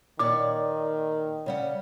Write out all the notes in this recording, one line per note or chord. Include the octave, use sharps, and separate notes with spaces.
A#2 D#3 C#5 D5 D6
C#3 G3 F#5